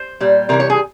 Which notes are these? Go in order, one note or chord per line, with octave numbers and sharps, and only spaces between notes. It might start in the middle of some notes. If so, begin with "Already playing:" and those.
Already playing: C5
A#2 G3
C3 E3 G3 A#4
C#5
G#4